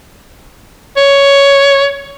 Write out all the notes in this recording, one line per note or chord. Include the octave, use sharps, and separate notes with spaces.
C#5